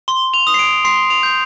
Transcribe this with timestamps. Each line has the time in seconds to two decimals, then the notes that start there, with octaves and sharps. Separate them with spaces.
0.08 C6 G7
0.34 F7
0.47 D#6
0.54 C7
0.59 D7
0.85 C6 C7
1.10 F7
1.23 G6